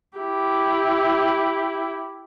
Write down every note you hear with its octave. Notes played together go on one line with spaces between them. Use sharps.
E4 G4